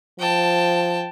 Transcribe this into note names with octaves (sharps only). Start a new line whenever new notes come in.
F3 G5 A5